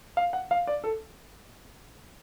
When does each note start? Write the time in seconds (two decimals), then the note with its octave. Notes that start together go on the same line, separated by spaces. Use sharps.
0.17 F5
0.33 F#5
0.51 F5
0.67 D5
0.84 A4